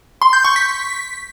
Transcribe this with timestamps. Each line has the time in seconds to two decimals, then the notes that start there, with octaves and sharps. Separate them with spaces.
0.22 C6
0.33 G6
0.44 C#6
0.56 B6